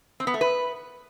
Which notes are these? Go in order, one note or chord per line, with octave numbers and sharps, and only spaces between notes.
C4
B3
A3
B4